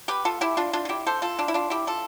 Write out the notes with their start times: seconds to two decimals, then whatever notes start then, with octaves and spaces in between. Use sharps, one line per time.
0.08 G4 B4
0.25 F4 A4
0.41 E4 G4
0.57 D4 F4
0.73 D4 F4
0.85 F4
0.89 E4 G4
1.06 A4 C5
1.22 F4 A4
1.39 D4 F4
1.48 E4
1.54 D4 F4
1.70 E4 G4
1.87 F4 A4